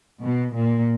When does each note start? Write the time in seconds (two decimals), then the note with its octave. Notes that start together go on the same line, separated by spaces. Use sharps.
0.22 B2
0.53 A#2